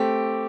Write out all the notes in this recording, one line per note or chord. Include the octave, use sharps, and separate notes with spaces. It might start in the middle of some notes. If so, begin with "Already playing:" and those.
Already playing: A3 C4 G4